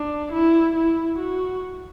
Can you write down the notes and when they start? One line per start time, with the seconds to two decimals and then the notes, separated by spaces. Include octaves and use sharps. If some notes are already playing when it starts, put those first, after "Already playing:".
Already playing: D4
0.32 E4
0.75 E4
1.19 F#4